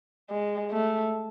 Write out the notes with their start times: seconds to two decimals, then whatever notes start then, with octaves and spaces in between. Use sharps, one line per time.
0.30 G#3
0.71 A3